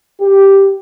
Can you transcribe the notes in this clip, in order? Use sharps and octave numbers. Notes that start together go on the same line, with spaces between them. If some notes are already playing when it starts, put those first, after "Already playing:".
G4